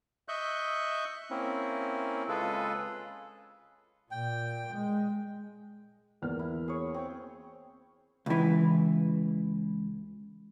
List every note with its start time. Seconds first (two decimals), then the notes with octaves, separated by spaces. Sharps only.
0.28 D#5 E5 C#6 F#6 G6
1.31 A#3 C4 C#4 E4
2.29 C#3 G#3 F4 G#4 A4 B4
4.11 A#2 G5
4.73 G#3
6.22 E2 A#3 F6
6.39 E4
6.68 G#4 C#5
6.94 C4 C#5 G5
8.26 C#2 E3